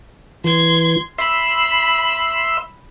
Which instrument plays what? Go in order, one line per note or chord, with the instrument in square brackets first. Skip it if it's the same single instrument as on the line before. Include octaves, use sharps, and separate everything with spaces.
[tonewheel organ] E3 [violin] C6 G#6
[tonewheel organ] E5 C6 E6 [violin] B5